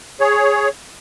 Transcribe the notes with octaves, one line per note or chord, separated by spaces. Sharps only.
G#4 C#5